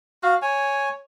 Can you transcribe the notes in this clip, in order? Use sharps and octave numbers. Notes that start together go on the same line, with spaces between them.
F#4 F5
C#5 G#5